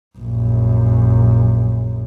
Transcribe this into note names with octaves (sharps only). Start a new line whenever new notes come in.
A#1 F#2